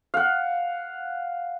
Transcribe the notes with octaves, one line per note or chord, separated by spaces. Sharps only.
F5 F#5